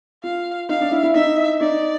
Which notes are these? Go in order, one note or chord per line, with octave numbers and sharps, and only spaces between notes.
F4 F5
D#4 F5
D4
E4
E4
D#4 E5
D#4 D5